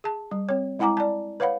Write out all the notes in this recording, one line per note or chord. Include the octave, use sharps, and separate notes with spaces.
G#4 A5
G3
C4 C#5
G#3 E4 F#5 G#5 A#5 D6
D5 A5
B4 C#5 F5 F#5 B5